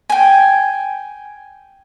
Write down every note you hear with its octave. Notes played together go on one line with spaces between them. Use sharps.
G5 G#5